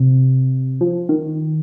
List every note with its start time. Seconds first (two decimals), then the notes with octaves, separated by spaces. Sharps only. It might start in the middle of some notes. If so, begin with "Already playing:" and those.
Already playing: C3
0.81 F3
1.09 D#3